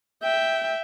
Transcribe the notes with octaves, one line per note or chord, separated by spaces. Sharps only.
E5 G5